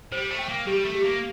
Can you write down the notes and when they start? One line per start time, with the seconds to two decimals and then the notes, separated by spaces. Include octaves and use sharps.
0.12 G3 C5
0.30 A3
0.39 G5
0.49 A#3
0.67 G3 G4
0.85 A3
0.95 G4
1.04 A#3